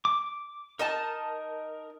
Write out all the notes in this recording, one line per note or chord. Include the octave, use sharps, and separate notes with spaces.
D6
D#4 A#4 D#5 A5